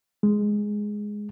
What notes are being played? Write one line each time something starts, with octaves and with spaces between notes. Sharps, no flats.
G#3